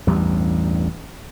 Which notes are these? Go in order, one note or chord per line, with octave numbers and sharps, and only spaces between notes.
A1 E2 G2 G3